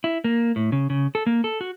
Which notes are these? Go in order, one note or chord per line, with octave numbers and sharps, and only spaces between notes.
E4
A#3
A2
C#3
C#3
A4
A#3
A4
F#4